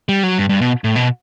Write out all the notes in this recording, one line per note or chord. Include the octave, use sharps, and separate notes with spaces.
G3
F#3
G2
G2
B2
A2
B2